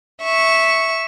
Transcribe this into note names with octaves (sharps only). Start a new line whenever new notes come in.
E5 C#6